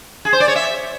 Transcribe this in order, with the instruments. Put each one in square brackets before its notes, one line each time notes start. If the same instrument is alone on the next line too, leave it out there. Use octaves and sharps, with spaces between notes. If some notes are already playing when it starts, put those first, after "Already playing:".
[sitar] G#4
C5
D5
C#5
E5